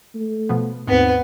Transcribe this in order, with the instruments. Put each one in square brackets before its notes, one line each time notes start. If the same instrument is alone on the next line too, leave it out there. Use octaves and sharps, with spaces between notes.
[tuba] A3
[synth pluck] B2 F3 B3
[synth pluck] D#2 G#2 [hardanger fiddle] B3 B4 [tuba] C4